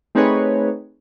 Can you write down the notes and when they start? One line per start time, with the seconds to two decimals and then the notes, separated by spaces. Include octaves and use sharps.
0.15 A3 C4 D#4 G#4 B4 C#5